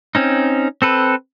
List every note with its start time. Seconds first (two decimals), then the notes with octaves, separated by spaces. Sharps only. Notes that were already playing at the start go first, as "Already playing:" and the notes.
0.15 C4 C#4 D#4
0.82 C4 A4 B4